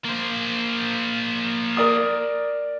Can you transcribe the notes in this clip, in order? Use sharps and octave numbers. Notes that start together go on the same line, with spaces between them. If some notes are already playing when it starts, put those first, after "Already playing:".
A#3 C5
A#4 D5 D#6